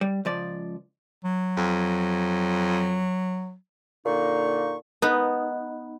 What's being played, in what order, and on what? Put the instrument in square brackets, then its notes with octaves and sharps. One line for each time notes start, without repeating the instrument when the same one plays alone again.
[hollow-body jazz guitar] G3
C#2 F3 D5
[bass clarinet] F#3
[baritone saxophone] F2
[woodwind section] A#2 D3 A#3 D#4 C#6
[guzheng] B3 D#4 B4